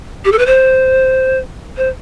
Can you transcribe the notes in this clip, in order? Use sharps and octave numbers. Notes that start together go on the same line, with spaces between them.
G4
A4
B4
C5
C5